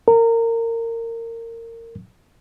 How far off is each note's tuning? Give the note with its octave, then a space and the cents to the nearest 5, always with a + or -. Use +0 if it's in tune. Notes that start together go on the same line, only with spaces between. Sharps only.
A#4 -25